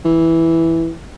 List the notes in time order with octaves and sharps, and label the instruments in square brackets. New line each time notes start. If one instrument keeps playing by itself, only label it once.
[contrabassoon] E3